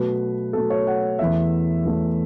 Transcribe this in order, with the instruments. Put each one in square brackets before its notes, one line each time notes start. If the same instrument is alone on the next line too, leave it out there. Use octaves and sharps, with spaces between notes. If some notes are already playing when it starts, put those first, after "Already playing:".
Already playing: [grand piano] B2 F#3 A3 B4
B2 F#3 A3 A4
C#5
F#5
E2 E3 A3 E5
E2 E3 A3